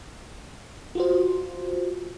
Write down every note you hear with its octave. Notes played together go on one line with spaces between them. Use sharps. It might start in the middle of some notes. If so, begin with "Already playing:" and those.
F4 F#4 C5